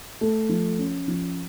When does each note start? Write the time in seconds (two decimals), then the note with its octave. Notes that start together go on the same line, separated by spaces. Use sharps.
0.21 A3
0.49 F3
0.79 C#4
1.08 F3